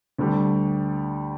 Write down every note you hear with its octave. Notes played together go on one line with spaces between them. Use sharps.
D2 D3 G3